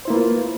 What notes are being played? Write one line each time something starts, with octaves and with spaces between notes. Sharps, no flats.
A#3 E4 F4 B4 C5